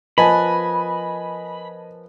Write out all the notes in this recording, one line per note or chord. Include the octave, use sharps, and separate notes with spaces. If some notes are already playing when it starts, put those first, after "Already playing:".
F3 A#4 B4 D#5 G#5 A5 B5